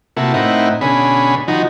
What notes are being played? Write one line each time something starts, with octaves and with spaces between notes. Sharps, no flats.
C3 A#3 E4 F#4 A4
A2 C4 D#4 E4 A#4 F#5
B2 D3 C#4 G#4 B5
D#3 F3 D#4 F#4